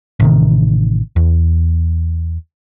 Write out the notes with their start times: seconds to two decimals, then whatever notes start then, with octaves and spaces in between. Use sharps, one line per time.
0.20 A1 C3 D#3
1.16 E2